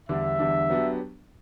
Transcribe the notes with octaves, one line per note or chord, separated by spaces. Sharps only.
E2 D3 G3 D4 E5
E2 D3 G3 D4
F#3 B3 D4 G4